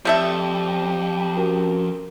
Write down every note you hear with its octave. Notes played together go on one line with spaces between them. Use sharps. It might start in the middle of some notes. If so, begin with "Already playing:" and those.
F2 G3 A3 G4 E5
C#4 F#4 A#4